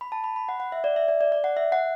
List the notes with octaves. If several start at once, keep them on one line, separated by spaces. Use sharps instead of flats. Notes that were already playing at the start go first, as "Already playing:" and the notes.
B5
A5
B5
B5
F#5
F#5
E5
D5
E5
D5
D5
D5
F#5
E5
F#5